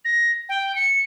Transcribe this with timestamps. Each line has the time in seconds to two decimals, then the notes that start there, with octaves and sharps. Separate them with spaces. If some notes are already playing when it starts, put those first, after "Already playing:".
0.05 A#6
0.49 G5
0.75 C#7